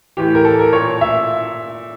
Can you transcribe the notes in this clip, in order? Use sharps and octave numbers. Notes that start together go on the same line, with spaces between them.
A2 E3 G4
A#4
A4
A#4
A#2 C#5
E5